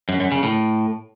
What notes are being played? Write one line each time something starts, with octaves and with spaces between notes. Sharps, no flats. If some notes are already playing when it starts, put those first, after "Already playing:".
F#2
F#2
C#3
A2